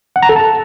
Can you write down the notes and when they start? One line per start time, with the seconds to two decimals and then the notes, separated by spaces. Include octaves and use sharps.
0.16 F#5
0.23 A#5
0.29 A4
0.36 A5